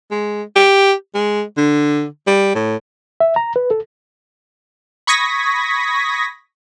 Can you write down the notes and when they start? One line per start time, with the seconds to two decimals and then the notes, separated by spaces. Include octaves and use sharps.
0.11 G#3
0.56 G4
1.15 G#3
1.57 D3
2.27 G3
2.55 A2
3.20 E5
3.36 A#5
3.56 B4
3.71 A4
5.07 B5 C#6 D#6 G#6 A#6 B6